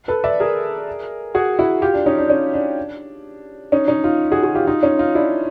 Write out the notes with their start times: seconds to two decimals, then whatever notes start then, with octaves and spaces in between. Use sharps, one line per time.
0.08 A4 B4
0.24 D5 E5
0.40 G#4 A#4
1.35 F#4 G#4
1.59 E4 F#4
1.82 F4 G4
1.94 D4
2.06 C#4 D#4
2.18 D4
2.30 C#4
2.54 D4
3.72 C#4 D#4
3.88 C#4 D#4
4.04 D#4 F4
4.32 F#4 G#4
4.43 F#4 G#4
4.55 F4 G4
4.67 D#4 F4
4.83 C#4 D#4
4.99 D#4 F4
5.15 D4 E4